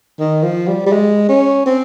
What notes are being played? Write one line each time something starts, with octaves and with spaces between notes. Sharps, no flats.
D#3
F3
G3
G3
G#3
C#4
C4